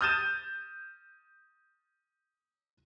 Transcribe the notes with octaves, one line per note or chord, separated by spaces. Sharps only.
D#6 F6 G6 A6 D#7 E7